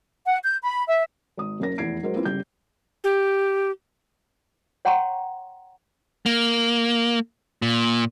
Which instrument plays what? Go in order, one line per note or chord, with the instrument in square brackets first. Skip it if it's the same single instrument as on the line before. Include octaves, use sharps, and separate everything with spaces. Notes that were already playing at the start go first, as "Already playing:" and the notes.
[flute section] F#5
G6
B5
E5
[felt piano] G#1 D#6
F#1 A#3 C#4 A#4 A#6
F1 E2 E4 G#6 C7 D7
F#3 G#3 A#4 C5
A#3 C4 E4 F4 B4
G1 C#3 G4 G6
[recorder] G4
[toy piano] C#5 F#5 G5 A#5 C6 C#6
[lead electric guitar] A#3
A#2